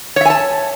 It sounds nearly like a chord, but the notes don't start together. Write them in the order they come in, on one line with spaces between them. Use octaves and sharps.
C#5 E5 G#5 A5